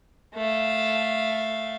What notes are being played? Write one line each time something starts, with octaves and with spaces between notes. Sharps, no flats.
A3 F5